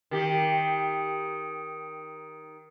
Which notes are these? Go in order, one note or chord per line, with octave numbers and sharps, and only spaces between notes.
D#3 G4